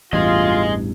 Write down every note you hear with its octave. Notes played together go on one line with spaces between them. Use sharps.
A1 E2 G2 F4 G#4 D#5